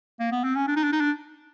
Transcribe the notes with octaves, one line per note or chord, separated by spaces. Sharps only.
A#3
B3
C4
C#4
D4
D#4
D4
D#4
D4